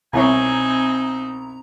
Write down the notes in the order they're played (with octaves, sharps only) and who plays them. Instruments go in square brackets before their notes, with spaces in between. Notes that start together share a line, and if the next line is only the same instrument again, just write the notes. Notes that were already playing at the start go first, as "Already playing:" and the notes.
[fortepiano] C2 E4 C#5 [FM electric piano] B2 A#5 [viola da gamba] C4 D#4 [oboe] G#5